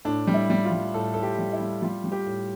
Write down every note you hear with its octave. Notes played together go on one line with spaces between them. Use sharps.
A2 D4
G3
E4
G3
F4
G3
A2 A4
A2 A4
G4
G3
E4
G3
G3 F4
G3
G4
A2